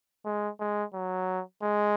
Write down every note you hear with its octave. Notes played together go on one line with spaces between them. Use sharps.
G#3
G#3
F#3
G#3